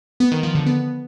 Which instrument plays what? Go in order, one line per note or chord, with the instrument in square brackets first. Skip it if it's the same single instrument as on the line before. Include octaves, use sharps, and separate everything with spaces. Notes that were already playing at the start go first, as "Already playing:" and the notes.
[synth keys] B3
D#3
F3
D3
B3